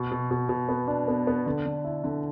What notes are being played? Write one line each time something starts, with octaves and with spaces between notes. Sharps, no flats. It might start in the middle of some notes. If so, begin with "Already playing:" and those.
Already playing: B2
B2
B2
B2
B3
D4
B3
B3
D3
D3
E4
D3